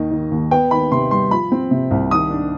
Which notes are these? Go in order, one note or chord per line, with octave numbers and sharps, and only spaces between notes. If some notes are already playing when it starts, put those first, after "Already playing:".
Already playing: D#2 D#3 D#5
D#3
D#2
B3 G5
D#3 B5
C3 C6
G3 C6
F3 B5
C4
C3
C2
D#3 D#6
D4